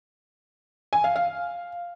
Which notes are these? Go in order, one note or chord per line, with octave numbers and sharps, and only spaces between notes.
G#5
F5
F5